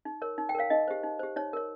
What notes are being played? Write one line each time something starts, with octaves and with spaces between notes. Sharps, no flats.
D#4
A#4 C#5
D#4
G5
A#4 C#5 F5
D#4 D#5
G4 C5
D#4
G4 C5
D#4 C#5
A#4 C#5